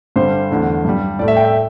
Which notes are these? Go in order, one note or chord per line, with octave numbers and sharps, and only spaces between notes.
G2 D3 G3 C5
E2 D3 A3
G2 G3
A2 A3 D5
E5
G5
E5